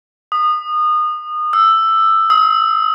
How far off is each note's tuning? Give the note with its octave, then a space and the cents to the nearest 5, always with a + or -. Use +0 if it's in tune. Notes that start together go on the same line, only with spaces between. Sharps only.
D#6 -25
E6 +10
D#6 +35